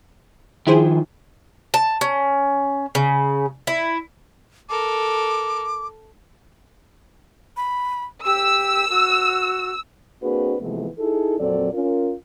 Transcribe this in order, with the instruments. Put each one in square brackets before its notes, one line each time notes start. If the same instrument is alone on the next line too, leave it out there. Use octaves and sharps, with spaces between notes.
[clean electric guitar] D#3 F3 [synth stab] E4 G#4 C5
[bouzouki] A5
C#4
C#3
E4
[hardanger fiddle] A4 A#4 [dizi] D6
[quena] B5
[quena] G4 [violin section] E6
[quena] F#4
[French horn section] A#3 C4 D4 F#4 G#4 B4
C3 E3 F3 G#3 A3 B3
D#4 E4 G#4 A4
F2 A#2 F#3 C4 A4 D5
C#4 F4 A#4